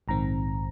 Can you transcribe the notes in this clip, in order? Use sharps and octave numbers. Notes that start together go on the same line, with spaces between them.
A#1 G#2 D#3 C4 A#5